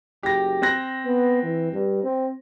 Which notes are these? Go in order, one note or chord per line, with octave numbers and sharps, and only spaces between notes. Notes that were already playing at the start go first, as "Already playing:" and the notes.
F#1 G4 A#6
C4 F#6 A#6
B3
E3
G2
C4